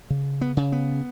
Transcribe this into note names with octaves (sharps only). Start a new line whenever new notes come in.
C#3
B3
C#3
B3